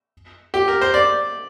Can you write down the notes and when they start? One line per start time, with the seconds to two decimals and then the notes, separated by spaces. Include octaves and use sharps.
0.54 G4
0.68 A#4
0.81 C5
0.94 D5